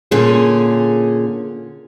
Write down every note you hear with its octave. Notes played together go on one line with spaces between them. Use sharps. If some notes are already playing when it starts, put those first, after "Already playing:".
A#2 D3 C#4 G#4